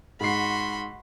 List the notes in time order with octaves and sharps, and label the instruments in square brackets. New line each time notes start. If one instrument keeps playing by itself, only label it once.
[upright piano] G#2 C7 [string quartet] F#4 [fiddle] B5 C6